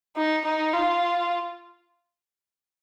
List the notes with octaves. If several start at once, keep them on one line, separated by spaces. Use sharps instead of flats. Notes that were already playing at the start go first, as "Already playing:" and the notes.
D#4
D#4
F4